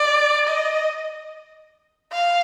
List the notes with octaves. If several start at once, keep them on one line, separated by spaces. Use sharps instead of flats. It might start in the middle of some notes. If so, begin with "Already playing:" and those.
Already playing: D5
D#5
F5